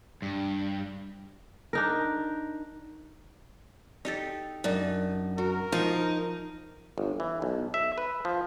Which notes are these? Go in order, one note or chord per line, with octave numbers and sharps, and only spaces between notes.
G2
D4 D#4 A#4
D#4 G4 A4
F#2 D4 D#4
F#4 A#4
F3 D#4 F5 C#6
G1
E3
B1
E5
B4
F3